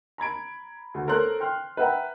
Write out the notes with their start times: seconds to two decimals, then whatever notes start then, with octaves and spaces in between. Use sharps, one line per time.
0.18 A#5 B5 G#6 D7
0.94 D2
1.07 A4 A#4 C5 C#5 C6 F#6
1.40 G5 C6 F6
1.77 B4 E5 F#5 G5 A#5